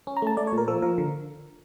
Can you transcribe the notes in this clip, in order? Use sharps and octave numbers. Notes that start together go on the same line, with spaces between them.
C#4
A#5
A3 A5
A3 D5
C#5
A#2
A#4
F3 A4
F3 A#4
D3